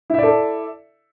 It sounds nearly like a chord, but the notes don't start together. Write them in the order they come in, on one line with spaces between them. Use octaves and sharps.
E4 E5 D5 A4